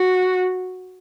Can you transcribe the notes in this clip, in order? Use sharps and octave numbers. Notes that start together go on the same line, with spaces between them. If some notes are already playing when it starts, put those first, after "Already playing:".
Already playing: F#4